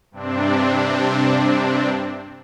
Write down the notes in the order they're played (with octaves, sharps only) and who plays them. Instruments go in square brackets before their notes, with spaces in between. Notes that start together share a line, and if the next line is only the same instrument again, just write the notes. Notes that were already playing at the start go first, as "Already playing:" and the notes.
[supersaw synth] G2 C3 C4 D4